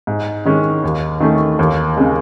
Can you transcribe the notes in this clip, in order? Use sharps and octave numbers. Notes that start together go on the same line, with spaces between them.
G#2
D#3 G#3 C#4
D#2
D#3 A3 C#4
D#2
C#3 G#3